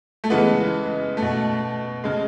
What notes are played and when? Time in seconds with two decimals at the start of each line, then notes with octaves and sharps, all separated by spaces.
0.24 A3
0.30 C#3 E3 G#3 B3
1.17 A3
1.22 B2
2.04 C#3 G#3